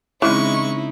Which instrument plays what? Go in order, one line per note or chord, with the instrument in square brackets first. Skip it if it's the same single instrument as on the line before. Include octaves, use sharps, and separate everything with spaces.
[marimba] C#3 C4 C#4 [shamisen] E3 [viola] G#3 C#6 [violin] D#4 E4